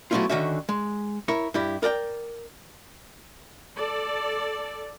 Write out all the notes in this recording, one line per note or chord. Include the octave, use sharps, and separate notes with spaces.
F#3 A3 B3 C#4 E4 F4
D3 D#3 C#4 F#4 C#5 E5
G#3
E4 A#4 C#5
G2 E4 G4
A#4 D5 F#5 G5
A4 D5